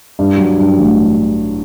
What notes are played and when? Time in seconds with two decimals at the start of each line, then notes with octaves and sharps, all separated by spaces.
0.19 G2
0.38 F#3
0.59 G2
0.78 A1